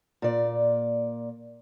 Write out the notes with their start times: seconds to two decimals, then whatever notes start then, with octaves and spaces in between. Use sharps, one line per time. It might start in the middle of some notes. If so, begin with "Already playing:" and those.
0.22 A#2 D5